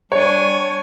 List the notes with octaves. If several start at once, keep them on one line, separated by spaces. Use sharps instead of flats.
G3 D4 C#5 G#5